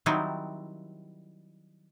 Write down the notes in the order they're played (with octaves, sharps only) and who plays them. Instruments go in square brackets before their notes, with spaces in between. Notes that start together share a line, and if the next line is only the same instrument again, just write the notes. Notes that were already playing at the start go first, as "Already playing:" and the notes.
[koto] D#3 F#3 G3 C4 D#4 E4